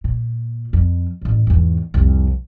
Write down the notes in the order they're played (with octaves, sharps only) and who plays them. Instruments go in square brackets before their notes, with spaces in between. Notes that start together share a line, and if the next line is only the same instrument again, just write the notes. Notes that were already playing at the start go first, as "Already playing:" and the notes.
[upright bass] A#2
F2
A1 G2
E2 G#2
C2 F2